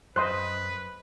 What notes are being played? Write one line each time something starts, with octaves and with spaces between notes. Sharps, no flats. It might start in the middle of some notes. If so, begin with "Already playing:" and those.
F#2 B4 C5 D#5 C6 F#6